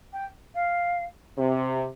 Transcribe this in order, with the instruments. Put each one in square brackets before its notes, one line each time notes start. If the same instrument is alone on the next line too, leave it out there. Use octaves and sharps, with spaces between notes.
[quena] G5
F5
[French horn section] C3